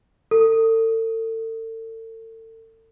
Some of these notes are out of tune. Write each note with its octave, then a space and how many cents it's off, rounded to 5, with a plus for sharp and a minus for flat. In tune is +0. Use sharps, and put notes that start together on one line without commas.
A4 +35